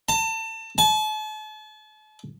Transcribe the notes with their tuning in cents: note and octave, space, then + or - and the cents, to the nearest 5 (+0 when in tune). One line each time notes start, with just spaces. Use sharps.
A5 +30
A5 -40